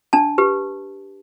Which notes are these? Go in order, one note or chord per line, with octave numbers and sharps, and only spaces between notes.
D4 A5
G4 B4